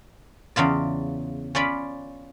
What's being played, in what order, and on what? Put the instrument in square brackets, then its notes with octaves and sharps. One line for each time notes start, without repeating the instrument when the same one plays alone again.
[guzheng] E2 C#3 F4 D5
C#4 F4 D5 B5